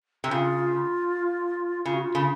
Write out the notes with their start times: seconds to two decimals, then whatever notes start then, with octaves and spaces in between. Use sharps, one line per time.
0.24 C3
0.30 C#3 F4
1.85 C#3 F4
1.94 F#4
2.02 F4
2.15 C#3